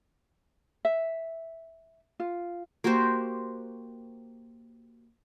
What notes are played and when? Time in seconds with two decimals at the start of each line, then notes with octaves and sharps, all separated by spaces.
0.85 E5
2.20 F4
2.84 A#3 F#4 G4 C5